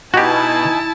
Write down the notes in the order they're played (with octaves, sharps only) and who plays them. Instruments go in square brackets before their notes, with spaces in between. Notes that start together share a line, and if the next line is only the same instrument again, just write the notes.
[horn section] B2 [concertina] D#4 G#5 [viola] E4 A5 [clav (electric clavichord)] F#4 G4